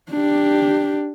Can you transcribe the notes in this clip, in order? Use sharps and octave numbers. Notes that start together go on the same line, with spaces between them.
D4 G4